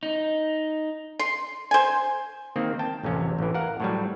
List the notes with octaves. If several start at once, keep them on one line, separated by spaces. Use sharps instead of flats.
D#4
C6
C5 G#5
D#3 A#3 C4
G5 A5
A1 F2 C3 C#4
A1 E3
A#4 F5 F#5
A2 F#3 G3